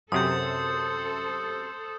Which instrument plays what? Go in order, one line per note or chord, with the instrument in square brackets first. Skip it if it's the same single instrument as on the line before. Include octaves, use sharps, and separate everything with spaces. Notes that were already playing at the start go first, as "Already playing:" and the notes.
[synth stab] F#2 C3 [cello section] A4 C5 [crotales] D#6 G6